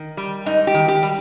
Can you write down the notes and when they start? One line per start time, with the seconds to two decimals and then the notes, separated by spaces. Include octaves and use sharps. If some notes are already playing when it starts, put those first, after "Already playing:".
Already playing: D#3
0.17 G3
0.46 G#2 D#4
0.67 G4
0.74 D#3
0.88 G4
1.03 G3